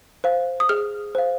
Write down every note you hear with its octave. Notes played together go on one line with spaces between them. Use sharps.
C5 F5
D#6
G#4 F6
C5 F5